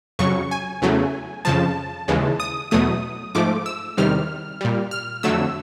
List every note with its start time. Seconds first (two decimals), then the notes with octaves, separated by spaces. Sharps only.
0.19 F2 C#3 F#3 C#6
0.51 G#5
0.82 E2 C#3 F#3 A3
1.45 F2 C#3 F3 A5
2.08 D#2 C#3 E3 G#3
2.40 D#6
2.71 E2 B2 F#3 A3 D#6
3.35 G#2 F3 A3 D6
3.66 E6
3.97 E2 C3 D#3 G3 F6
4.61 A#2 G3
4.91 F6
5.23 F2 D3 F#3 A3 E6